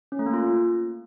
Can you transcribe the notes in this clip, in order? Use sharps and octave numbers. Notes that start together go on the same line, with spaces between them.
C#4
A3
A#3
F4